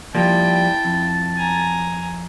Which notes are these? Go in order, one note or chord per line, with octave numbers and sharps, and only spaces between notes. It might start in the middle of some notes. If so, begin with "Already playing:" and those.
F3 G3 A#3 E4 G5 A5
F2
G#5 A#5